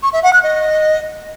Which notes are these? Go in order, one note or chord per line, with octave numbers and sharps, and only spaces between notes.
C#6
E5
F#5
F#6
D#5